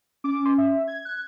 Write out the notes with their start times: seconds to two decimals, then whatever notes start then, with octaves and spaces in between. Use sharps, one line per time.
0.24 C#4 D6
0.46 C6
0.58 E5
0.88 G#6
1.05 F#6